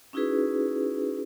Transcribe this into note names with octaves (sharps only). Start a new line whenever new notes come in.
C#4 D#4 E4 F#4 G#4 B4